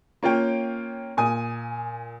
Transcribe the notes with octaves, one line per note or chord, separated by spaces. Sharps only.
A#3 C#4 F4 C#5 G5
A#2 G#5 D#6